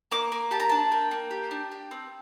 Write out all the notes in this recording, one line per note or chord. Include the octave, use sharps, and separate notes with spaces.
A#3 D6
A#3
G4 A5
A#5
D4 A5
A#3 G5
A#3
G4
D4
G4
C4